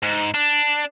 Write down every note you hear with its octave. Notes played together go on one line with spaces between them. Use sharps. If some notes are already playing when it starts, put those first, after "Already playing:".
G#2
D4